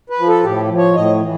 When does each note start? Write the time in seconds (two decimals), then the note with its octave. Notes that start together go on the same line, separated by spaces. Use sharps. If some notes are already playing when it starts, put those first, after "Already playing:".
0.10 B4
0.19 F3
0.28 A4
0.44 A2 G4
0.70 F3
0.78 C#5
0.95 A2 D#5
1.21 E3